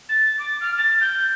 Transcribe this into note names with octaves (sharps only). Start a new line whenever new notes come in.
A6
D6
F6
A6
G6